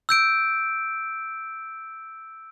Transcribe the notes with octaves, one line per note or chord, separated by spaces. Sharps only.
E6 G6 D7